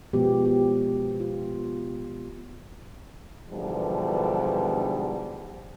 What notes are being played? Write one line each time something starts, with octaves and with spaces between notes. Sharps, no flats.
B2 F3 G#3 B3 G4
G4
F4
G#2 B2 D3 E3 F3 G3